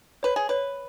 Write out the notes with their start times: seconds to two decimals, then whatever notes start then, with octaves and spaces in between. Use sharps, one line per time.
0.23 B4 C#5
0.36 G#4
0.49 B4 C#5